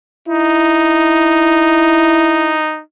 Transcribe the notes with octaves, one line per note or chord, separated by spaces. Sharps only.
D#4 E4